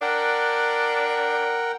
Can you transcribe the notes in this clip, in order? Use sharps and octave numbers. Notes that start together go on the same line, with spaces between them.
D4 A#4 F#5 G5